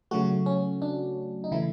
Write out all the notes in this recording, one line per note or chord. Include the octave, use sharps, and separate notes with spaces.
C#3 F#3 A3 F#4
C#4
D4
D#4
C#3 E3 A3 E4